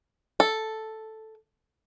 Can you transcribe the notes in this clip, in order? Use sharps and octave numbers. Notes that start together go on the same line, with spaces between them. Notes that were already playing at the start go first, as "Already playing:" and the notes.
A4